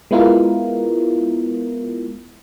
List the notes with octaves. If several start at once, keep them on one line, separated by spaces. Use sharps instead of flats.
G#3 B3 E4 F4 A#4